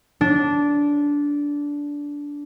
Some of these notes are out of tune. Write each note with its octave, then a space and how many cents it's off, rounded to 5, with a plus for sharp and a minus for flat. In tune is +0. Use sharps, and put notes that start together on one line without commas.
D4 -15